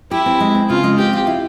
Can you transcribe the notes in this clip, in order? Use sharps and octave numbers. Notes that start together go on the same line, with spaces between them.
E4 G4
C4
G#3
C4
C#3 F4
G#3
C4 G4
F4
E4